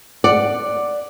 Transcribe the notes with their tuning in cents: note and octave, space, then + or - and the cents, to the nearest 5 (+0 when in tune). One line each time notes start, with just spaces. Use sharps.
D5 +5 F#5 +0